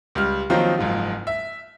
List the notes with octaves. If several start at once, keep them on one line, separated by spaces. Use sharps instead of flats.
C#2 G3 F6
D#3 F3 F#3 A#3 C4 D#4
F#1 G#2 F3 F4
E5